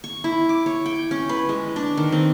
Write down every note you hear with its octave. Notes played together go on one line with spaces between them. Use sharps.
C#6
E4
D6
C#5
G5
C#4
B4
G#3
D4
D#3
C4